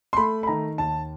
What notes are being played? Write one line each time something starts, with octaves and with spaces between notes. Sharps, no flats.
C6
A3 B5
B5
D#3 A#5
D#2 A5